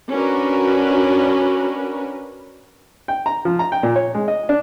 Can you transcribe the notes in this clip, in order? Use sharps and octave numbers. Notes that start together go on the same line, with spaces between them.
C#4 D4 F#4 A#4 B4
G5
A#5
F3
A#5
G5
A#2
C#5
G#3
D#5
D4